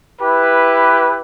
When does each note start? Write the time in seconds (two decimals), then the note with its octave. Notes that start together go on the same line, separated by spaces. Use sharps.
0.20 E4 G4 B4